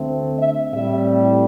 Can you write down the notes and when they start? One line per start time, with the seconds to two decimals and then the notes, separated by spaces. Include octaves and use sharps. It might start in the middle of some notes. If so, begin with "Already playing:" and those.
Already playing: D2 D3 A3 C4
0.39 E5
0.72 A2 G3 C4 E5